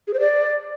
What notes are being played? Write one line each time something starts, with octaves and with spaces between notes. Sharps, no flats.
G#4
C5
D5